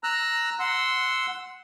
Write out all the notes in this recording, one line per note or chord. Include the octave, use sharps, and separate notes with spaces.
A#5 E6 F#6
F#5 C6 E6